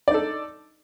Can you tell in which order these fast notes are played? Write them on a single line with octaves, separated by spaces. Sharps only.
D5 D#4 A4